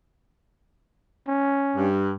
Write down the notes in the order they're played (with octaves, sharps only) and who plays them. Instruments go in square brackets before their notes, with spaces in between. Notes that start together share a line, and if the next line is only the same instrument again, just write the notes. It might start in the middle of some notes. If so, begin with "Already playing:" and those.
[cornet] C#4
[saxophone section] G2